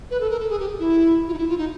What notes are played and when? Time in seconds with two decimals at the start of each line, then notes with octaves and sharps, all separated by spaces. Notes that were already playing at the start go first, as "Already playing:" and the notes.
0.11 B4
0.20 A4
0.30 A#4
0.39 A4
0.50 G#4
0.60 G4
0.79 E4
1.28 F4
1.34 D#4
1.38 E4
1.48 F4
1.58 D#4